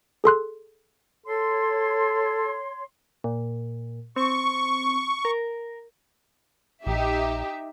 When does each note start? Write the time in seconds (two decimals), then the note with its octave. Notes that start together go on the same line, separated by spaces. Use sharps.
0.24 G#4 A4 C6 F#6
1.26 A4 C#5 C6
3.24 A#2
4.16 C4 C#6
5.25 A#4
6.86 A#1 D#4 G4 E5